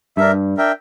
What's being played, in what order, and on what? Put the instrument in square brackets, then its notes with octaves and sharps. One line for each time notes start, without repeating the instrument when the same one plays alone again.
[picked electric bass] G2 [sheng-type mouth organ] D4 A#4 E5
[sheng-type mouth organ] D4 A#4 E5 G5